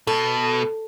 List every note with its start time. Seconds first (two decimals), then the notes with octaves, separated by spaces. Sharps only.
0.07 B2 A4